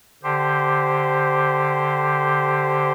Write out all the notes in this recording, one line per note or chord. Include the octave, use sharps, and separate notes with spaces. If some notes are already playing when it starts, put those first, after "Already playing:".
D3 G4 C5